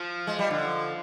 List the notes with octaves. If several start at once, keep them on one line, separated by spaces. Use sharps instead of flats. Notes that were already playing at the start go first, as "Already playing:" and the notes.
Already playing: F3
G#3
G3
D3